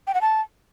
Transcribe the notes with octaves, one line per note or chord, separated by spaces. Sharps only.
G5
F#5
A5